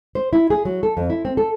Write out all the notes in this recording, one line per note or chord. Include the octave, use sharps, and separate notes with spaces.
C5
E4
G#4
F#3
A4
F2
E4
C4
A4